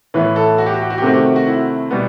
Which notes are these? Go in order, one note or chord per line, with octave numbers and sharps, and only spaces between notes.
A2 E3 B3 B4
A4
F#4
G4
F#4
G4
F#4
G4
C3 D#3 A3 C4 F#4
G4
F#4
F#4
E4
B2 G3 B3